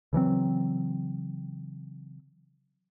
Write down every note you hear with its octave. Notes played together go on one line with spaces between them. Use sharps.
C#3 E3 F#3 C4